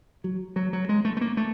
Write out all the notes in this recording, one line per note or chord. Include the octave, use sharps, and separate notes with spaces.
F#3
F#3
F#3
G#3
A3
A3
A#3
A3